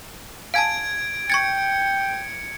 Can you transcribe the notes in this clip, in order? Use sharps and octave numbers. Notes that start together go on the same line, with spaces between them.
F5 G#5 A5 G#6 D7
G5 C#6 G#6 A6 C#7